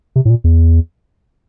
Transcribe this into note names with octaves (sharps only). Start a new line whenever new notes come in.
C3
A2
A#2
E2